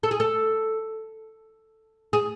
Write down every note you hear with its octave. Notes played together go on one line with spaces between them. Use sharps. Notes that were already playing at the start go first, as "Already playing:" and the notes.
A4
G#4
A4
G#4